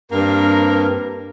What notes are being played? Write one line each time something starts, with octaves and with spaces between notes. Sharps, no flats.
G2 A#3 C4 A#4